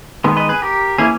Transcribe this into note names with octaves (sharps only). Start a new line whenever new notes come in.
D#3 G#3 B3
B4 D#5
G#4 B4
G4 A#4
E3 A#3 C#4 E4 G#4